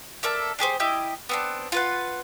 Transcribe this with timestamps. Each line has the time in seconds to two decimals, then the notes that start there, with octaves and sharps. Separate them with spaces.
0.23 A4 A#4 D5 E5
0.59 D4 G4 G#4 C5
0.80 E4 G4 D#5 G6
1.29 B3 C4 D4
1.72 F4 B4 F#5